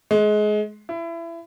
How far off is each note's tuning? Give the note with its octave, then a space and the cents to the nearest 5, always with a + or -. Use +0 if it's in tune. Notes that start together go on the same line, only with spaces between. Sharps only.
G#3 +25
E4 +25